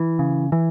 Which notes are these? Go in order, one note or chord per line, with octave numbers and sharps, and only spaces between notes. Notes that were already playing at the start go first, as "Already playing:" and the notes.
Already playing: E3
C#3
E3